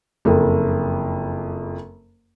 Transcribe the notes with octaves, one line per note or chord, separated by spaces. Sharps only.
F#1 F2